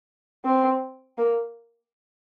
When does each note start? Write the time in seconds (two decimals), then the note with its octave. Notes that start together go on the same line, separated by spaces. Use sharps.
0.45 C4
1.18 A#3